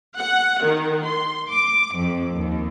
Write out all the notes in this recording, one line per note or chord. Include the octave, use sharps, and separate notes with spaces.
F#5
D#3
C6
D6
F2
D#2